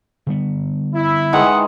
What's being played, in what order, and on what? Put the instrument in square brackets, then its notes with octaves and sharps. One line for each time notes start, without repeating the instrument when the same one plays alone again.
[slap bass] D3 G3 B3
[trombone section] E4
[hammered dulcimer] D#3 E3 G#3 [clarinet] F#5